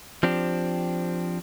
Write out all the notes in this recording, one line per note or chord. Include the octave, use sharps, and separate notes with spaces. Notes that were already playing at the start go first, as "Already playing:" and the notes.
F3 C4 D4 G4